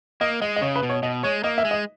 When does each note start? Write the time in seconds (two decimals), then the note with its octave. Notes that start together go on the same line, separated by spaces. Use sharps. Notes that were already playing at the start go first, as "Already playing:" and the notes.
0.21 A#3 D#5
0.42 G#3 D#5
0.56 D#5
0.62 C#3 C#5
0.76 B4
0.83 B2
0.89 C#5
1.03 B2 D#5
1.23 G#3 C#5
1.44 A#3 D#5
1.58 E5
1.65 G#3
1.71 D#5